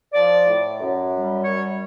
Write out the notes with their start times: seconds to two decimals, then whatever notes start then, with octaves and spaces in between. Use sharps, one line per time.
0.13 F3 D5
0.46 A2
0.79 F#2
1.12 G3
1.44 F#2 C#5